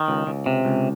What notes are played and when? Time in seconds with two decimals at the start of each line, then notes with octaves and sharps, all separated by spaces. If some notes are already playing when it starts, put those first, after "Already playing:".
Already playing: D#3
0.08 C#2
0.27 C#2
0.46 C3
0.65 C#2